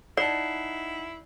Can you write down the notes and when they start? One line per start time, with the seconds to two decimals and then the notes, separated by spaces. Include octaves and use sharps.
0.17 D#4 E4 D5 F#5 A5 C7